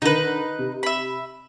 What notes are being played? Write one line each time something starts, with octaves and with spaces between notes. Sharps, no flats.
D3 D#3 D#4 B4
C3
E5 B5